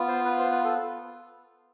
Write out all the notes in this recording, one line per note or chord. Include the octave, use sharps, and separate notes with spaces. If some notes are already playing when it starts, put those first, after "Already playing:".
Already playing: B3 F4
C5
B4
C5
B4
A4